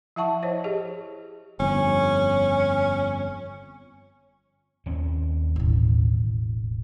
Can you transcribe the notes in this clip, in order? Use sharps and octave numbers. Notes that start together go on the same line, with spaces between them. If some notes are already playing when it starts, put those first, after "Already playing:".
F3 E4 E5 F#5 A5 C#6
E4 C5 C#5 D#5
G4 G#4 D#5
G1 F2 C#4
D#2 C4 C#4
E1 A1